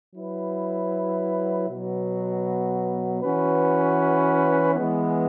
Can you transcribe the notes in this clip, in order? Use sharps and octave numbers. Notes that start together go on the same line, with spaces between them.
F#3 E4 B4
B2 F#3 B3
E3 C#4 F#4 B4
E3 G#3 B3